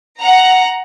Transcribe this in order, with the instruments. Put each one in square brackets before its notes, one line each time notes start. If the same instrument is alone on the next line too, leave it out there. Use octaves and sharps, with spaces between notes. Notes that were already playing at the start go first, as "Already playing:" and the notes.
[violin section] F#5 A#5